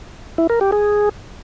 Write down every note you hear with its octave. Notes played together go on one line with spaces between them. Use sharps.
E4
A#4
G4
G#4